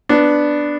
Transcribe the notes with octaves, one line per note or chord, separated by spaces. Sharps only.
B3 D4